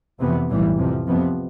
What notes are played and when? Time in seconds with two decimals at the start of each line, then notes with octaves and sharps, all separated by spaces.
0.20 F2 C3 E3 B3
0.49 B1 A2 E3 G3
0.77 F2 C3 F3
1.07 F2 C3 F3 B3